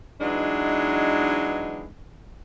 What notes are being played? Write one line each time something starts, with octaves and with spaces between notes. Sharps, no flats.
E3 F#3 G#3 B3 D4 D#4